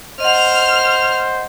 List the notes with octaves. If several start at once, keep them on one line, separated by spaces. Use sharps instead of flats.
C5 D#5 F#5 F6 F7